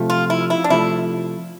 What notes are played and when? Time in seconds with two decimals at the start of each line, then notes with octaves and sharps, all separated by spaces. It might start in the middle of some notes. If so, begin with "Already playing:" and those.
Already playing: C3 F3 A3
0.10 F4
0.30 E4
0.50 E4
0.64 D4
0.70 C3 F3 A3 E4